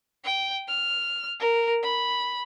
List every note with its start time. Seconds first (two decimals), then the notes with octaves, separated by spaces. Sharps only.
0.24 G5
0.68 F6
1.40 A#4
1.83 B5